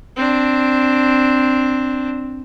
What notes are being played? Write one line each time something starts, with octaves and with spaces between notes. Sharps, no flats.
C4 D4